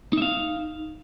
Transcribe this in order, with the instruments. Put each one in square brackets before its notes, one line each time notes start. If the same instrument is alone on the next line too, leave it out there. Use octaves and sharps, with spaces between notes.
[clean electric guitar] D#4
E5
F5